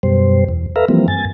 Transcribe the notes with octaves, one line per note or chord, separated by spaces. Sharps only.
F#2 B2 G3 C5
E2
A4 B4 E5 F5 A#5
E3 F3 G3 A#3 C4
G2 G#5 A6